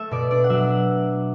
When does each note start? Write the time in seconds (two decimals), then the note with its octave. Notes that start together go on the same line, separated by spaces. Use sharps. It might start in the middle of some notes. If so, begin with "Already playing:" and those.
Already playing: A3 E5
0.11 B2 D5
0.31 D4 D5
0.44 F#5
0.50 F#3 E5